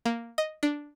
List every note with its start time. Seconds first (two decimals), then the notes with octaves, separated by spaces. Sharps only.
0.06 A#3
0.38 D#5
0.63 D4